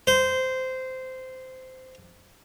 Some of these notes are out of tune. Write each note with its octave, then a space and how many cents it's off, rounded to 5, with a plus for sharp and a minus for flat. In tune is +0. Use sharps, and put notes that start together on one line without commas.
C5 -15